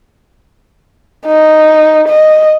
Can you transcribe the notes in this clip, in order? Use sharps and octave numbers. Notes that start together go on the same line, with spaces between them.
D#4
D#5